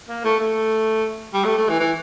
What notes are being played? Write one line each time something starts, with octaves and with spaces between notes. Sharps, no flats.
A#3
A3
A3
G3
A3
A3
E3
E3